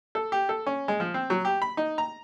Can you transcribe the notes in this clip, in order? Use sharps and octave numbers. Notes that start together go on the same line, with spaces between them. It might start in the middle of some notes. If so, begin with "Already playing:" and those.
A4
G4
A4
C#4
G#3
F3
C4
F#3
G4
B5
D#4
A#5